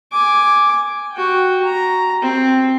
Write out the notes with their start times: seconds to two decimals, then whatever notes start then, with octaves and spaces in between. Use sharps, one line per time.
0.12 G#5 D6
1.12 F#4 G5
1.64 A#5
2.22 C4